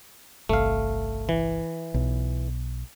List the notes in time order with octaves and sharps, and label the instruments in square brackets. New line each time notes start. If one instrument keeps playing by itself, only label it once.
[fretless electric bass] G1 C2 [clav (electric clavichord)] A3 F5
[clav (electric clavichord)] E3
[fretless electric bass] B1